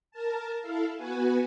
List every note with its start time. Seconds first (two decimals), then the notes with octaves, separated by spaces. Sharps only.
0.11 A#4 A5
0.61 E4 A4 F5
0.96 B3 F#4 B4 G#5